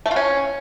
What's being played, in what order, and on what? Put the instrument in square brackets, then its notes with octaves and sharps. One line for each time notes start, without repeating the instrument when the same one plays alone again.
[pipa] A3
F4
C#4